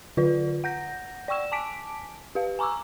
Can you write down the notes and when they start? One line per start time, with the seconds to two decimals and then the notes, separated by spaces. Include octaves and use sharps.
0.17 D3 F4 B4 D5
0.64 F#5 G6 A#6
1.28 D5 G5 C#6 E6 E7
1.52 G#5 A5 D6 B6 D7
2.35 G4 B4 F5
2.59 G#5 A#5 C#6 D6 E6